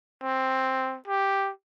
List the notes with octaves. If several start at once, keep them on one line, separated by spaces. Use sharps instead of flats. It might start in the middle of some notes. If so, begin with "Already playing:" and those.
C4
G4